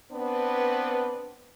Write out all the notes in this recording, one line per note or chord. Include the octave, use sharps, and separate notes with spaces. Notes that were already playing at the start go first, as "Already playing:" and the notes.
B3 C4 D4 B4